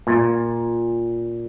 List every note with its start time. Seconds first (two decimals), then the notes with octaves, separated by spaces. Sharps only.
0.07 A#2